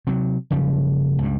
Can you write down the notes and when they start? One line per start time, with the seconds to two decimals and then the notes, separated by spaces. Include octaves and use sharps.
0.07 C3 F#3
0.51 F#1 C#3 F3 G3
1.18 C#2 G2